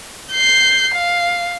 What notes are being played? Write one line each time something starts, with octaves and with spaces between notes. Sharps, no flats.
G6 C7
F5